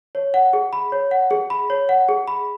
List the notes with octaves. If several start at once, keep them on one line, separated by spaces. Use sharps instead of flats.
C#5
F#5
G#4
B5
C#5
F#5
G#4
B5
C#5
F#5
G#4
B5